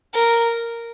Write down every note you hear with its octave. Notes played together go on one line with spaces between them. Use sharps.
A#4